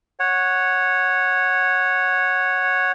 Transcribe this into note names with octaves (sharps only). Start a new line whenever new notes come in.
C#5 F#5